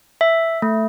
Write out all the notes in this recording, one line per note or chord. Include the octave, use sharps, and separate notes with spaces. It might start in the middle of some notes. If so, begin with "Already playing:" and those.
E5
A3